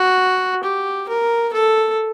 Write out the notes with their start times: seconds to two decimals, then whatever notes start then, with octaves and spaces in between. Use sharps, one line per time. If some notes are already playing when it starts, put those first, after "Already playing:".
Already playing: F#4
0.63 G4
1.09 A#4
1.53 A4